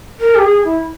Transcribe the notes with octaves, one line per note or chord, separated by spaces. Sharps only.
A#4
G4
G#4
E4